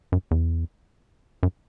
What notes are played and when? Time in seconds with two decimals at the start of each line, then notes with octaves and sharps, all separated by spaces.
0.12 F#2
0.31 E2
1.43 F#2